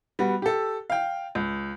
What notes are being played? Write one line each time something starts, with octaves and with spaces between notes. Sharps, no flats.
G3 B3 F#4
G4 A4
F5 G5
C#2